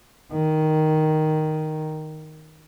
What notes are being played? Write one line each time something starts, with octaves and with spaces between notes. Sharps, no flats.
D#3